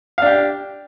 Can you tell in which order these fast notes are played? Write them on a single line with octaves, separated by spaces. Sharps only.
F5 D4 G4